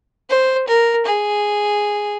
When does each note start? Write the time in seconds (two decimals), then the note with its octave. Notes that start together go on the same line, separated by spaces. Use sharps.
0.30 C5
0.68 A#4
1.06 G#4